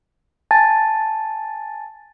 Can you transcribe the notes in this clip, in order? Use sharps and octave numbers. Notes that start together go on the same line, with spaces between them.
G#5 A5 A6